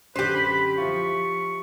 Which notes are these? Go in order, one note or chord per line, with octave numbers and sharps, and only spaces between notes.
F#2 D3 G4 B4 C5
B5
F3 E4 F4 C#6